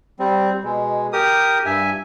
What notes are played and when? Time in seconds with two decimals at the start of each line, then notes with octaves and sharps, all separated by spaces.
0.19 G3 C4
0.64 B2 G#3
1.13 G4 A#4 D#6
1.65 G2 E5 G#5